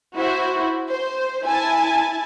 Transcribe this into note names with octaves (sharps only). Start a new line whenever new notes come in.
E4 F#4 C5
C5
E4 G#5 A5